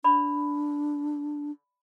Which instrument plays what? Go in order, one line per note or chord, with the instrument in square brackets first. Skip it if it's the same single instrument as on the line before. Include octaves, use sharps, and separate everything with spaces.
[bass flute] D4 [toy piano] D5 B5